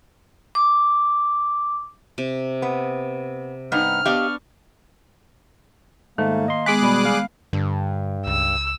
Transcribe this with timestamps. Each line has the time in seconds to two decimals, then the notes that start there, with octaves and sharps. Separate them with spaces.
0.55 D6
2.18 C3
2.62 B3
3.72 G2 B3 D#4 F6
4.05 B3 D4 G4 D#5 F5 C#6
6.18 G#2 D#3 A3 A#3
6.48 D#5 C6
6.66 G#3 B3 G#4 D6 F#6
6.83 B2 G3 B5
7.05 F5
7.53 G2 D3
8.27 C#2 E6